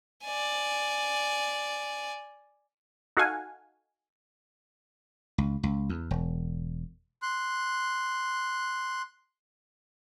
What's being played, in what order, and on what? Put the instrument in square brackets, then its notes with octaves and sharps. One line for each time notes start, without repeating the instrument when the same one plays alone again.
[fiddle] D5 G#5
[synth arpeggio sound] D#4 F#4 A4 F5 F#5 G#5
[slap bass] C#2
C#2
E2
E1
[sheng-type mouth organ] C6 F#6